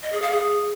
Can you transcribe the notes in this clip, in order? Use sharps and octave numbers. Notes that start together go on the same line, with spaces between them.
D#5
G#4
F5
G#4